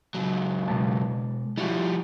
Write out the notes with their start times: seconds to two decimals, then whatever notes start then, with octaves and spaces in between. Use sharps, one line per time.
0.14 C#2 F#3
0.68 B2 G#3 A5
1.58 F3 G3 E4 F#4